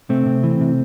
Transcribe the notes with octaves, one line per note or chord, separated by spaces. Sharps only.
C3 A3 C4
C3
E3
C3